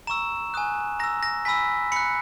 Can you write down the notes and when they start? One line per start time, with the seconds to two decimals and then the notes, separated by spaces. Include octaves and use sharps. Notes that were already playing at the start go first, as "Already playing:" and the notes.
0.07 A#5 C#6 E6 E7
0.54 G#5 D#6 F#6
0.99 A#5 E6 A#6
1.23 A#6
1.45 G#5 B5 E6 B6
1.92 B5 F#6 C#7